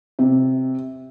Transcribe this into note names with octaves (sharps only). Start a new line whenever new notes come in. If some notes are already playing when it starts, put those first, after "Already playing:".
C3